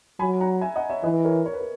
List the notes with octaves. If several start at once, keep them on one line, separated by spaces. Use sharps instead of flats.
F#3 G#5 B5
F#5 A#5
E5 G#5
D#5 F#5
C#5 E5
E3 B4 D#5
A#4 C#5
C#5
B4
A#4